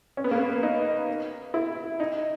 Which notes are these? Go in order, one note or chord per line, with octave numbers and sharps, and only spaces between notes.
C#4
B3
A#3
B3
D#4
E4
D#4